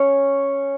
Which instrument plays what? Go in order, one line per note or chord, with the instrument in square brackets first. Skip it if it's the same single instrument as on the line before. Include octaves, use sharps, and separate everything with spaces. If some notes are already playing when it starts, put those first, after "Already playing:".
Already playing: [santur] C#4 C#5